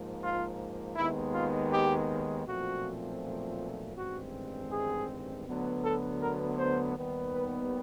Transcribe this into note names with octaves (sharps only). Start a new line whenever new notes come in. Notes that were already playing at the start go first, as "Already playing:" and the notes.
Already playing: G#2 F3 A#3
F4
D#2 D#3 G#3 B3 E4
F4
G4
B1 A#2 F3 A3 C4 F#4
A1 G2 D#3 G#3 C4 F#4
G#4
D2 D3 F#3 B3
A4
A#4
C5
D#2 D#3 G3 B3
B4